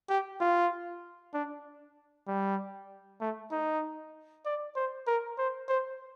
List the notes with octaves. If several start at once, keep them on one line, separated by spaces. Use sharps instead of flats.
G4
F4
D4
G3
A3
D#4
D5
C5
A#4
C5
C5